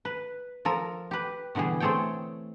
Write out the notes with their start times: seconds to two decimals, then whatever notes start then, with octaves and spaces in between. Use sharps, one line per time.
0.05 B4
0.65 F3 A4 A#4
1.11 G4 B4
1.55 B2 D3 E3 G3 G#4
1.80 A3 C4 G#4 A4 C#5 G5